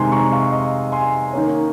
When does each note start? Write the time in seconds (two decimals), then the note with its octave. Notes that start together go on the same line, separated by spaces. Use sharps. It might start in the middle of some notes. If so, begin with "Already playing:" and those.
Already playing: C3 D#3 G#3 D#4 G#5 C6
0.12 A#5 C#6
0.32 F5
0.52 D#5
0.92 G#5 C6
1.33 D#3 A#3 C#4